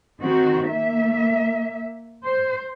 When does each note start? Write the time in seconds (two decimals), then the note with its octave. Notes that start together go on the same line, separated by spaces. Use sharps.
0.20 D#3 C4 F#4
0.67 A#3 E5
2.25 C5